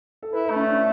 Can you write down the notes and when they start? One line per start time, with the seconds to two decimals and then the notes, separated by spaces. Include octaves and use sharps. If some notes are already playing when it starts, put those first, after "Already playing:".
0.22 A4
0.33 E4 B4
0.45 B4
0.50 A3
0.56 C#4
0.68 D4
0.76 E4